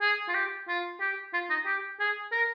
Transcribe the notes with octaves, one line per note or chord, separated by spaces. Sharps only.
G#4
F4
G4
F4
G4
F4
D#4
G4
G#4
A#4